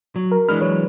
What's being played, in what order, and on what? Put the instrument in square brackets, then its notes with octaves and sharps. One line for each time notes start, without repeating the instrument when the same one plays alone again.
[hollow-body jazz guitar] F#3
[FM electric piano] A#4
[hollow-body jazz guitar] E3 G#3 D4 [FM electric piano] B5 F6
[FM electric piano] F#3 B4 C#5